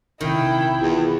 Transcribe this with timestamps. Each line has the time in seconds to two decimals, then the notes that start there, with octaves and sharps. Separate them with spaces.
0.21 A#1 C3 D#3 E4 G5
0.81 E2 F4